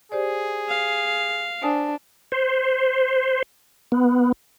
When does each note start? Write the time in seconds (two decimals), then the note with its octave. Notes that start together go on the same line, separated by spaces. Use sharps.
0.12 G4 G#4 C5 D5
0.69 F5
1.62 D4 C5 G#5 D#6
2.32 C5
3.92 B3